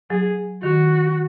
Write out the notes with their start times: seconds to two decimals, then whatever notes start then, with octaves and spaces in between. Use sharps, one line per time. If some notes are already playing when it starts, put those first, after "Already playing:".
0.10 F#3 G#4
0.63 D#3 F#4